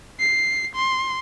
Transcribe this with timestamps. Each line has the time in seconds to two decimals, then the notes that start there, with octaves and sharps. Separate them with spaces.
0.19 C7
0.75 C6